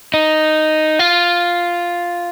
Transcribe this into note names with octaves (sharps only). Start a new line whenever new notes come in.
D#4
F4